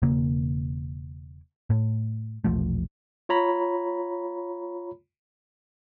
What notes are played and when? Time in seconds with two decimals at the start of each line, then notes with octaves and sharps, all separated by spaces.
0.02 E1 C#3 A#3
1.70 A2
2.44 E1 A#1 F3 A3
3.29 F4 C#5 A#5 B5